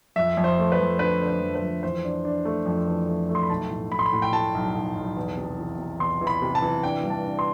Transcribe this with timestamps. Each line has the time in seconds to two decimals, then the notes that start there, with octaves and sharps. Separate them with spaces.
0.16 F2 E5
0.37 F2
0.44 C5
0.59 A3
0.72 B4
0.79 F2
0.99 D3 B4
1.21 D3
1.27 C5
1.41 F2
1.55 B4
1.62 F2
1.83 E3 C5
2.04 D4
2.25 D4
2.45 A3
2.66 F2
2.88 E3
3.08 A3
3.29 A3
3.35 C6
3.43 B5
3.49 B1 A5
3.70 A2
3.91 A2 B5
3.99 C6
4.06 B5
4.13 A2
4.22 G5
4.33 A2 A5
4.55 B1
4.75 B1
4.96 B1
5.17 E2
5.37 C3
5.58 E3
5.79 C3
5.99 E2 C6
6.21 E3
6.27 B5
6.42 C3
6.55 A5
6.62 E3
6.83 D4 G5
7.03 G2
7.10 A5
7.25 D4
7.39 C6